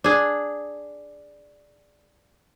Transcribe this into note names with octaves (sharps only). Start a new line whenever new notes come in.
D4 G#4